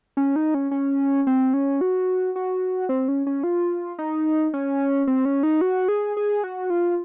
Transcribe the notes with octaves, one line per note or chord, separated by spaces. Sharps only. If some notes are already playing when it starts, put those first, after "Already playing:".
C#4
D#4
C#4
C#4
C4
C#4
F#4
F#4
C4
C#4
C#4
F4
D#4
C#4
C4
C#4
D#4
F#4
G#4
G#4
F#4
F4